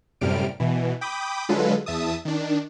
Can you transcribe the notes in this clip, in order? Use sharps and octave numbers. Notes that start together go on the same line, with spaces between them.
F#2 A2 C3 G3 F6 D7
B2 E3
G5 B5 D6 D#6 G6
D3 F#3 G#3 F4 A4 B4
E2 E5 A5 D#6
D#3 D4